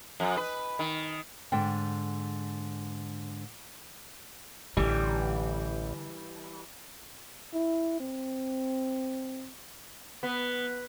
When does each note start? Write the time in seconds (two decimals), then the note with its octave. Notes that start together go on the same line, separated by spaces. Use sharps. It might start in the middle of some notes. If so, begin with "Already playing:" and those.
0.20 F2
0.37 B4
0.79 D#3
1.52 G#2 D3 G5
4.77 A1 D3 E3 G3
7.54 E4
8.00 C4
10.23 B3